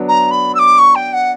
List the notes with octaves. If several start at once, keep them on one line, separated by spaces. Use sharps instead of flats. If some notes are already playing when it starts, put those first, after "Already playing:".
Already playing: F#3 B3 D4
A#5
B5
E6
D6
C#6
G5
F#5